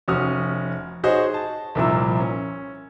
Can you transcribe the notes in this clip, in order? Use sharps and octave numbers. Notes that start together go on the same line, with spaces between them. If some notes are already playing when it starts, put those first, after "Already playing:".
F1 C#4 F#4 D#6 F6
D#4 F#4 G#4 C5 C#5 D#5
A5
C2 F2 A#2 A#3 E4 E6
C#4